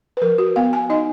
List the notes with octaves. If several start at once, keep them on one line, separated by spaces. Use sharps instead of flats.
B4
F3 A#4
F#4
B3 F5
G#5
D#4 D#5